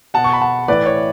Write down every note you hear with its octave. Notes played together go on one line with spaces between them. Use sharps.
B2 F#5 A5
C#6
B5
F#5 A5
A2 E3 B4 D5
C#5